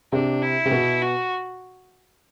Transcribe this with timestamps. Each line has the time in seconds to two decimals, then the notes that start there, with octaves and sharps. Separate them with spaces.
0.12 C3 D4
0.42 E4
0.65 C3
0.71 B2
1.01 F#4